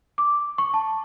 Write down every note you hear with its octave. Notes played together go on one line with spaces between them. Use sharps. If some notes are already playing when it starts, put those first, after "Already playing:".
D6
C#6
A5